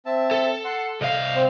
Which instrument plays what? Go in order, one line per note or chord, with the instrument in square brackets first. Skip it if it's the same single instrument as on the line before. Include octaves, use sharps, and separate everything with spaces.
[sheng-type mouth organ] C4 E5 A5
[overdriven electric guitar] A4
[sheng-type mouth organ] F#5 C6
[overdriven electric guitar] C2 F5 [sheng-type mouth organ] D#5 G6
[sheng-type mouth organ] C4 C5